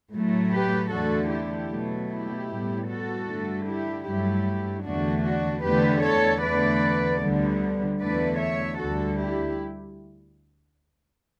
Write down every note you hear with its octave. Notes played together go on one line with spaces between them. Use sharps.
A2 F#3 A3
G4 B4
E2 D3 A3 F#4 A4
E4 G4
B2 F#3 A3
E4 G4
A2 G3 B3
F#4 A4
G2 D3 A3
E4 G4
G2 F#3 A3 E4 G4
E2 D3 A3 D4 F#4
D4 F#4
E2 D3 A3 G4 B4
A4 C#5
E2 D3 A3 B4 D5
D2 D3 G3 B3
E2 D3 A3 B4 D5
C#5 E5
D2 D3 G3 F#4 A4
E4 G4